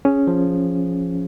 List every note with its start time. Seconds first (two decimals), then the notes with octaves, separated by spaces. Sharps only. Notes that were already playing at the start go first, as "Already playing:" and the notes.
0.05 C#4 G#4
0.27 F3